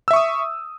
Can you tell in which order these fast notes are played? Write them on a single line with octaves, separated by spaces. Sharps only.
E6 E5 C#6 D#6